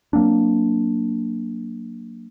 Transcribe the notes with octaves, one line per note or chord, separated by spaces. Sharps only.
F#3 A#3 C4 D4